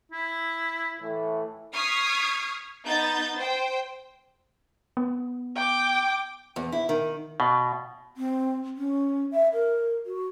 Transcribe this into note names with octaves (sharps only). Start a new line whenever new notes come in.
E4
A2 E3 A3
C#6 D#6 F6 G#6 B6 C7
B3 D#4 G6 A6
C5 G5
B3
G5 D6
E2
E4
D#3
B2
C4
C#4
E5
A#4
F#4